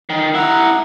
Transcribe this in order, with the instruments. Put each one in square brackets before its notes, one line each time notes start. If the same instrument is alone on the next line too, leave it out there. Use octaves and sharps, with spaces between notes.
[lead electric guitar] D#3
[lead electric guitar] E4 A#5 [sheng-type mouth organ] F#5